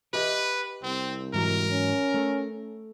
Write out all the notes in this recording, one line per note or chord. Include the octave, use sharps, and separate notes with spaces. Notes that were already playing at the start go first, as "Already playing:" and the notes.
G4 B4 D#5 E5
C2 C4
G#2 E3 F#3 A#4
C#4
A3